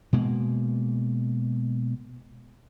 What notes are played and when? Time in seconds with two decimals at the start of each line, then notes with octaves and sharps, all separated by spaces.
0.13 B2 G#3 A#3